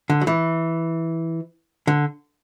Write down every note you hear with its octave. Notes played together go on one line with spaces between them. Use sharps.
D3
F#3
E3
D3